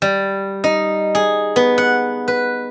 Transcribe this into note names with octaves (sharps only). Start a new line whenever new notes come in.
G3
D#4
G#4
B3
F#5
B4